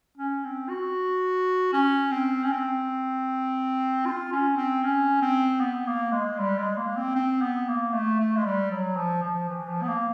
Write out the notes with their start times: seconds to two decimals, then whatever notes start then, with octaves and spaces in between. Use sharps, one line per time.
0.18 C#4
0.44 C4
0.69 F#4
1.73 C#4
2.11 C4
2.44 C#4
2.51 C4
4.06 F4
4.32 C#4
4.57 C4
4.84 C#4
5.22 C4
5.60 B3
5.86 A#3
6.12 G#3
6.39 G3
6.58 G#3
6.77 A#3
6.96 C4
7.15 C4
7.42 B3
7.68 A#3
7.94 A3
8.19 A3
8.37 G#3
8.45 G3
8.71 F#3
8.96 F3
9.23 F3
9.49 E3
9.68 F3
9.83 B3
9.88 A#3